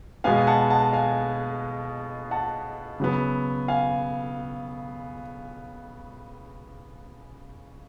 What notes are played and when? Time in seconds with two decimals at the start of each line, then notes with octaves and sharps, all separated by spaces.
0.24 B2 G#3 B3 F5 G#5
0.42 G#5
0.47 F#5 A5
0.70 F#5 A5
0.93 F5 G#5
2.31 F#5 A5
3.00 C#3 F#3 B3
3.68 F5 G#5